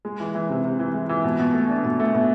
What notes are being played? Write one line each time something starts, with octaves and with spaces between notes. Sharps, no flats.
G#3
E3
E3
C3
C3
E3
G#3
E3
B2
B2
A3
D4
B2
A3
B2